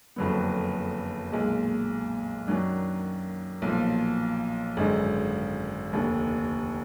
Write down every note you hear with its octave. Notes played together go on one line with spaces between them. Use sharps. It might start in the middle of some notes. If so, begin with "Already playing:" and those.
F#1 F2 D3 F#3 B3
B1 A#2 G#3
F#2 D#3 F#3 D4
B1 A#2 F3
G#1 F#2 D3 G#3 D#4
F1 D#2 D3